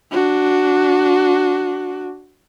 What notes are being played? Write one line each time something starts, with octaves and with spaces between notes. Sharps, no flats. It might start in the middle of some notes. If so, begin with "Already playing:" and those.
D4 F#4